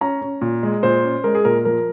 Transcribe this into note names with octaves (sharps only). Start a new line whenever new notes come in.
C#4 A#5
C#4
A#2
G#3
A#2 C5
C#4
G#3 A#4
G#4
A#2 A#4
F3 A#4